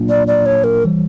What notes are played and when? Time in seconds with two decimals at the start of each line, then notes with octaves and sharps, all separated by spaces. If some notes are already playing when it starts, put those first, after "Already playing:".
Already playing: A#2 F#3 A#3 D4 F4
0.09 D5
0.27 D5
0.46 C#5
0.64 A#4
0.84 E3 G3